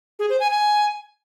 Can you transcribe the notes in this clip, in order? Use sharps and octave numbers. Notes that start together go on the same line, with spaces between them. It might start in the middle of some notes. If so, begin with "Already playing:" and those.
G#4
C5
G#5
G#5